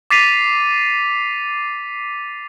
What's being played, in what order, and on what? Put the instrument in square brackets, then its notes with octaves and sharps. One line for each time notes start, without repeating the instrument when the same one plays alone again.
[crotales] D6 A6 B6 C7 D#7 F7